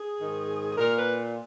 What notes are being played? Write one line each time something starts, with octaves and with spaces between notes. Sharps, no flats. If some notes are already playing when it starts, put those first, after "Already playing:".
Already playing: G#4
G#2 D#3
G#4
A#2 A#4
B4